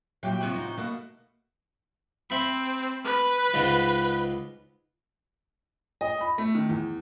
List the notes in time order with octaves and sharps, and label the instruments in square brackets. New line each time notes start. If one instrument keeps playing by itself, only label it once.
[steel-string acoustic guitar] A#2 F#3 E4 [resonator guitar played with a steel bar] G4 G5
[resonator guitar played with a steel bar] C3 F3 F#4
[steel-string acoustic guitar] A2 D#4
[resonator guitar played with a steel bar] B2 [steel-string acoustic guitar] A3 A#3 F#4
[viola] C4 [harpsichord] E5 B5
[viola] B4
[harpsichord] C#2 G#2
[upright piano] D#5
B5
A3
D#3
E2